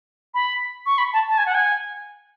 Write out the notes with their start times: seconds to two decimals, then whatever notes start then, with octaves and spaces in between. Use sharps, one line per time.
0.34 B5
0.86 C#6
0.98 B5
1.13 A5
1.29 A5
1.38 G#5
1.46 F#5
1.55 G#5